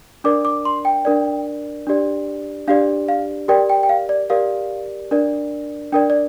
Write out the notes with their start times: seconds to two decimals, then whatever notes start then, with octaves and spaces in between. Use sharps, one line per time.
0.24 D4 A#4 D5 D6
0.45 D6
0.65 C6
0.85 G5
1.05 D4 A#4 D5
1.87 D4 G4 D5
2.68 D4 G4 D5 F5
3.09 F5
3.48 G4 A#4 D5 G5
3.69 G5
3.83 G5
3.89 F5
4.09 D5
4.30 G4 A#4 D5 F5
5.11 D4 A#4 D5
5.93 D4 A#4 D5 G5
6.10 D5